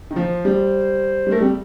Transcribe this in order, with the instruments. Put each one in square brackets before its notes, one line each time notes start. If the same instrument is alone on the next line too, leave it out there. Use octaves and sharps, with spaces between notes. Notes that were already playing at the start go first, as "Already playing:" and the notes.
[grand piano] D#3
[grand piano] F3 [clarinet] C5
[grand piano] G3
G3
[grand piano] A3 [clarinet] A#4
[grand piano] G3 [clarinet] C4